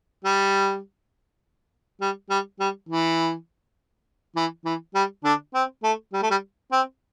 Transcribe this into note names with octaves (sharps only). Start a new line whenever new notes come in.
G3
G3
G3
G3
E3
E3
E3
G3
D3 D4
C4
A3
G3
A3
G3
C4